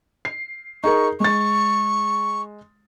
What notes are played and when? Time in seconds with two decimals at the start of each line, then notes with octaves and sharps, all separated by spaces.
0.25 C7
0.84 D#4 G#4 A#4 C#6
1.20 G#3 C#6 A6